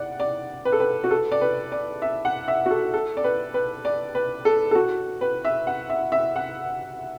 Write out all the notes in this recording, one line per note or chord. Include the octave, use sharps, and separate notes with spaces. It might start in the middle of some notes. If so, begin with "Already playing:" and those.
Already playing: D5 F#5
D5
B4
A4
B4
F#4
A4
D5
B4
D5
E5
F#5
E5
F#4
A4
A4
D5
B4
B4
D5
B4
A4
A4
F#4
B4
E5
F#5
E5
E5
F#5